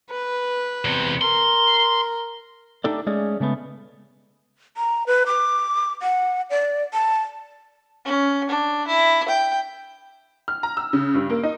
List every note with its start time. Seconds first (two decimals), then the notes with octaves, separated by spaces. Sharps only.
0.10 B4
0.85 E2 C3
1.21 A#4 C6
2.84 A3 D4 D#4 G4 A4 D5
3.07 G#3 A3 C#4 G#4 D5
3.40 C#3 G#3 A3 B3
4.77 A#5
5.07 B4
5.26 D6
6.02 F#5
6.50 D5
6.93 A5
8.05 C#4
8.49 D4
8.88 E4
9.29 G5
10.48 F6
10.63 A#5
10.77 E6
10.93 C#3
11.15 G2
11.30 A#3
11.43 D#4